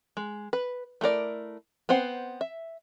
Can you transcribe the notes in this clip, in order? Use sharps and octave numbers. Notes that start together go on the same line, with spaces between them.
G#3
B4
A3 E4 A#4 D5
B3 C4 C5 F#5
E5